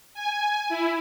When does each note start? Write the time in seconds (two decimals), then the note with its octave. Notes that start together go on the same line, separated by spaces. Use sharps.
0.14 G#5
0.69 E4